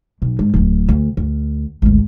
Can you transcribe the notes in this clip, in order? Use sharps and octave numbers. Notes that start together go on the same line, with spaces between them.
B1
G#2
D1 E2
D2
D2
G#1 D2